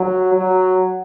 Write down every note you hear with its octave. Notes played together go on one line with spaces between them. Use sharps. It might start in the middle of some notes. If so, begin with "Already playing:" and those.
Already playing: F#3
F#3